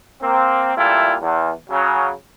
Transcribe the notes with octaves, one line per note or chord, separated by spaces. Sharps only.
A#3 C4
A#2 G3 A3 E4 F4
E2
C#3 F#3